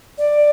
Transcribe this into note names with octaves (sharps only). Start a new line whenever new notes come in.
D5